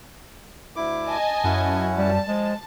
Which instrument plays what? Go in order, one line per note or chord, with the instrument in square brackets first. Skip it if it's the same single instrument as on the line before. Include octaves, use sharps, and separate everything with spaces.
[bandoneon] D2 E4 D6
[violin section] D#5 G#5 A5
[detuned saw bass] F#2 [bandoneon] C#4 E4 F#5
[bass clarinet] G3 [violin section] A5
[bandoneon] F3 [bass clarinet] G#3